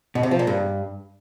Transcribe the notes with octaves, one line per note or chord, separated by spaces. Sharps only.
B2
C3
F3
A#2
G2